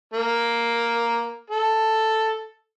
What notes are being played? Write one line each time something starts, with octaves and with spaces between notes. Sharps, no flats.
A#3
A4